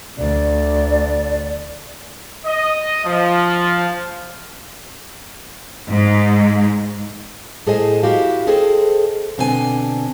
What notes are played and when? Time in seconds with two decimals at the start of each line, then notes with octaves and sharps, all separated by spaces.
0.19 D2 D5
2.45 D#5
3.05 F3
5.89 G#2
7.67 A2 G#4 A4 C5 D#5 G#5
8.03 E4 F#4 G4 F5
8.47 G#4 A4 C5 D#5 G5
9.38 B2 D3 C4 D4 A4 G#5